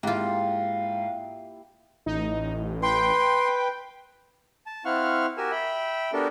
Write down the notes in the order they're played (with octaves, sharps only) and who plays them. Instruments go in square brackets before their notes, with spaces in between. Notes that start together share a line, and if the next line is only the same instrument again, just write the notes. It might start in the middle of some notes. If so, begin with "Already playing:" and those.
[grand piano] G#2 [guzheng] A#3 F4 [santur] E4 G4 [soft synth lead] F5
[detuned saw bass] A1 [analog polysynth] D#4
[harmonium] B4 [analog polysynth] G5 [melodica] C6
[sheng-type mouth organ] A5
C4 E4 F5 F#5 C#6 F6
F#4 G4 A#4 G#5 E6
E5 G5 B5
B3 D4 F#4 G4 A4 A#4